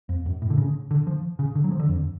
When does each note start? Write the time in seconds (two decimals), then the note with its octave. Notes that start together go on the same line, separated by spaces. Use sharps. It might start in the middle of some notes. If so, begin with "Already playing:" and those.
0.09 F2
0.26 F#2
0.42 A2
0.50 D3
0.58 C#3
0.91 D3
1.07 F3
1.39 C#3
1.55 D3
1.64 F#3
1.71 F3
1.80 D3
1.89 F2